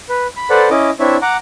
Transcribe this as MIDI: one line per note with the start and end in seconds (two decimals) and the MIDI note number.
0.09 0.27 71
0.37 0.50 83
0.50 0.69 69
0.50 0.69 71
0.50 0.69 72
0.50 0.69 74
0.50 0.69 78
0.70 0.90 61
0.70 0.90 64
0.70 0.90 75
0.70 0.90 86
1.00 1.17 60
1.00 1.17 62
1.00 1.17 64
1.00 1.17 73
1.00 1.17 76
1.22 1.37 78
1.22 1.37 82
1.22 1.37 86